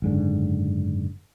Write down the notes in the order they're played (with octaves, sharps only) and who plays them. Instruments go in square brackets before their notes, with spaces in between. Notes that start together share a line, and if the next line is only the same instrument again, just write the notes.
[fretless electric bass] F#1 G#2 D3